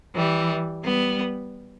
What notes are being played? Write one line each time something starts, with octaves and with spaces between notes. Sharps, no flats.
E3 G3
G3 B3